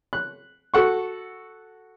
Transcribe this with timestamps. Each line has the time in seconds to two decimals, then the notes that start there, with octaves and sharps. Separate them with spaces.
0.13 F#6
0.74 F#4 A4 F#5 C#6